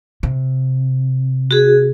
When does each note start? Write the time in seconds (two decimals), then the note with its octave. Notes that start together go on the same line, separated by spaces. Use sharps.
0.23 C3
1.51 F#4 G#4